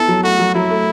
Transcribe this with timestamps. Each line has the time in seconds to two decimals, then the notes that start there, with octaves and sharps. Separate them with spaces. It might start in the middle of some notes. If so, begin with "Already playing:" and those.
Already playing: B3 E4 A4
0.08 F#3
0.23 A3 F#4
0.39 F#3
0.54 F#3 E4
0.70 A3